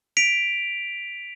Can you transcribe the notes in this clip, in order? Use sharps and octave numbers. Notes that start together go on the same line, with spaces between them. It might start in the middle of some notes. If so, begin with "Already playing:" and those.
B6 D7 F7